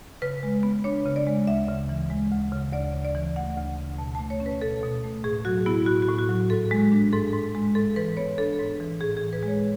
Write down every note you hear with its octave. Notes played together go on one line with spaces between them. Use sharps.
C#3 B4
G#3
B3
D4 C#5
C#3
D5
G#3
D2 E5
C#3
E3
G#3
D2
C#3
D2 D5
C#3
D5
E3
A3 F#5
D2
C#3
B2 A5
A3 A5
C#5
C#4
B4
B2 A4
B2
A3
A2 G#4
F#3 F#4
B3 E4
A2 F#4
F#4
A2
F#4
F#3
G#2 A4
G#3
D4
G#2 A4
G#2
G#3
G#2 A4
E3 B4
B3 C#5
D4 A4
G#2
E3
A2 G#4
G#4
E3
B4
G#3
C#5